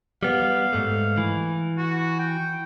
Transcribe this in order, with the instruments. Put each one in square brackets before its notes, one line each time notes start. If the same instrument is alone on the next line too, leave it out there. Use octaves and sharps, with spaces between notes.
[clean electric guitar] G3 B3 [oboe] F5
[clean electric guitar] G#2 A3
E3
[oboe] F#4
G5